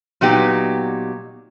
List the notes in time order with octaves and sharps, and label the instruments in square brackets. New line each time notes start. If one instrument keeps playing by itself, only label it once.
[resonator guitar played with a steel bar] A#2 F#3 B3 D#4 G4